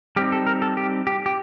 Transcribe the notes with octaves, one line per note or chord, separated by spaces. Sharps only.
G3 C4 D#4 G4
A4
A#4
A4
G4
G4
G4